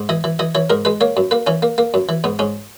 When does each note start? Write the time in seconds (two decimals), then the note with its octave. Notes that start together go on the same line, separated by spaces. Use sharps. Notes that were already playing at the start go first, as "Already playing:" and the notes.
Already playing: G#2
0.09 E3 D#5
0.24 E3
0.39 E3 D#5
0.55 E3 C#5
0.70 G#2 A#4
0.85 G#3 B4
1.01 A#3 C#5
1.17 F#2
1.31 A#3 B4
1.47 E3 C#4
1.63 A#3
1.78 A#3
1.94 F#2
2.09 E3
2.24 G#2 B3
2.39 G#2 C#4